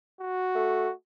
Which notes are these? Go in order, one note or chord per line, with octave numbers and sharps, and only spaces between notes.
F#4
A3